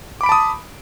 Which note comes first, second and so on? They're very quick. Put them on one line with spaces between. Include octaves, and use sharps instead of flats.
D6 B5 D7 A5 D#6